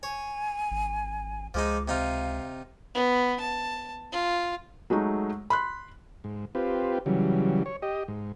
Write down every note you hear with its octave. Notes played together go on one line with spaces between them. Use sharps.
C#5 G#5
G#1
C#2 F3 G#3 D#4 D6
C3 D#4 F4 F5
B3
A5
F4
F#3 G#3 A3 D#4
B5 C6 F#6
G#2
C4 F4 G4 B4
C#3 E3 F#3 G3
C#5
G4 D#5
G#2